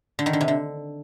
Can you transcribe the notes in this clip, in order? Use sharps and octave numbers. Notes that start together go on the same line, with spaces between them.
D3
D#3
D3
C3
D3